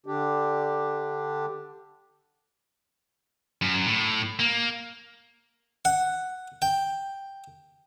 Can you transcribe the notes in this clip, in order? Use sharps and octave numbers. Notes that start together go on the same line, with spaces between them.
D3 D4 G4
F#2
A2
A#3
F#5
G5